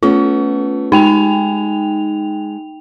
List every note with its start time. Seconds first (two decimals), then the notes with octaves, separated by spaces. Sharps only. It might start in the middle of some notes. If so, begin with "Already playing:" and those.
0.03 A3 B3 C#4 F4
0.92 G#3 D#4 G5 F7